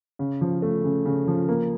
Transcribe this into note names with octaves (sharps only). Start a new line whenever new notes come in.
C#3
F3
A3
C#3
C#3
F3
A#3